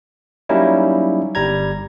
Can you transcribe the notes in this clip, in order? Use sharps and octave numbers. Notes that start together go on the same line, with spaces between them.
F#3 G3 A#3 C#4 D#4 E4
G1 G3 A#5 G#6